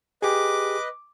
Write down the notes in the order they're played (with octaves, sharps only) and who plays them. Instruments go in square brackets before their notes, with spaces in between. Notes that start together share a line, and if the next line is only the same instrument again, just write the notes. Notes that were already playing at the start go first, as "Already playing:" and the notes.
[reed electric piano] G4 G#4 [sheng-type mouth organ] B4 D#5 [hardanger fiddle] D6